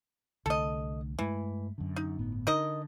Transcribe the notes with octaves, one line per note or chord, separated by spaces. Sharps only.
C2 D3 A3 A4 D#5
G2 E3 G#3 A3
F#2 D3
D#4
G1 A2 B3
D3 D#4 A#4 D#5